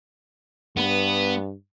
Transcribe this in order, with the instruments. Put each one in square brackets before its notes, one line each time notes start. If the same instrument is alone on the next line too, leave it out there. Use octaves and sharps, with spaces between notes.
[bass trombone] G2 [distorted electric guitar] B3